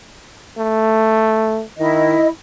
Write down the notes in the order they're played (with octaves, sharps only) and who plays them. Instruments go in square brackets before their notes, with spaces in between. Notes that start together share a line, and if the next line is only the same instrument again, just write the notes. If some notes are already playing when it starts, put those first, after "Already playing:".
[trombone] A3
[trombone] D#3 [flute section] E4 D#5